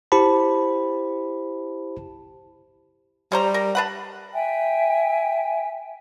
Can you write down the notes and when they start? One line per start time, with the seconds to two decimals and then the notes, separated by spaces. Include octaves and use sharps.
0.12 E4 G4 C5 A5 B5
3.32 G3 C#4 C5 A#5
3.54 A#4
3.75 D4 B4 F#5
4.34 E5 G5 G#5